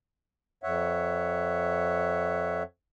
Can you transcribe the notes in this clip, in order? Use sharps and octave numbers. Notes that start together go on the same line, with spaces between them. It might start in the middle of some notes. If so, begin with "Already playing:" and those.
F2 C#5 E5 F#5